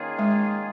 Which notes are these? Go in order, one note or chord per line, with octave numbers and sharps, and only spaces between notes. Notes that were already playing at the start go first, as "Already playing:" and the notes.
Already playing: D#3 A#3 C#4 F4 G#4
G#3